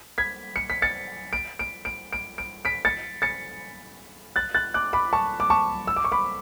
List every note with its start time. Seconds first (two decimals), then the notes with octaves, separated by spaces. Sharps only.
0.18 G#6 B6
0.56 C#7
0.70 B6
0.82 A6 C#7
1.33 D7
1.59 D7
1.85 D7
2.13 D7
2.38 D7
2.65 B6 D7
2.85 A6 C#7
3.22 A6 C#7
4.36 F#6 A6
4.55 F#6 A6
4.74 D6 F#6
4.93 B5 D6
5.13 A5 C#6
5.40 D6
5.50 A5 C#6
5.87 E6
5.96 D6
6.04 C#6
6.12 B5 D6